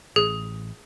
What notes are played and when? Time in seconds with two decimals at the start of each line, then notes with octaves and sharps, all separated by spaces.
0.16 A1 G#4